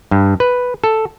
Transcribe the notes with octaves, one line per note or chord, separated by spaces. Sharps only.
G2
B4
A4